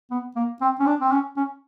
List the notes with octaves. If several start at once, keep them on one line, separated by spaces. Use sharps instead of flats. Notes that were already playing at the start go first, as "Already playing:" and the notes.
B3
A#3
C4
C#4
D4
C4
C#4
C#4